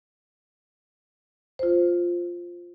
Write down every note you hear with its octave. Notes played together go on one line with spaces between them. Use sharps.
F4 C5